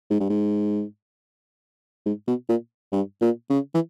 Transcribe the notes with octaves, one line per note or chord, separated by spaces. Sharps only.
G#2
G2
G#2
G#2
B2
A#2
G2
A#2
C#3
E3